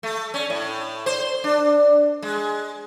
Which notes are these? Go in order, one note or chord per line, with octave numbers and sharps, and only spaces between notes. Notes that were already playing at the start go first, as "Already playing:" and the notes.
A3
C#4
A2
C5
D4
G#3